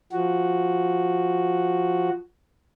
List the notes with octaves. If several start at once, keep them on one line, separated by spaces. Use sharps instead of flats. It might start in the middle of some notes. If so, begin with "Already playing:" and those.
F3 F#4